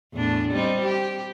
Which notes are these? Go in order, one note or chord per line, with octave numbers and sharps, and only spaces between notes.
E2 A2 D4
G3 C4 D#4
G4